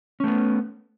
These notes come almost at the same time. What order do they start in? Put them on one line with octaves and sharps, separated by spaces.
C#4 A3 B3